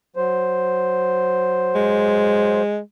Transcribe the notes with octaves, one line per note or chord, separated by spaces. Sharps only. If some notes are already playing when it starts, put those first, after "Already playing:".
F#3 C5
G#3